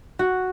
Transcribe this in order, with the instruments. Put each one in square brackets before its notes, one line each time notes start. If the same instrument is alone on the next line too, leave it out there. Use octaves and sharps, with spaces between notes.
[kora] F#4